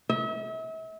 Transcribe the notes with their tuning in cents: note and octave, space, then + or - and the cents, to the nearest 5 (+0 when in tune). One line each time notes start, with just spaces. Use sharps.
E5 -40